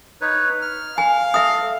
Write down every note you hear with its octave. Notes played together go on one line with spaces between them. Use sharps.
D#4 B4 C#5
F6
F5 G#5
A4 E5 D#6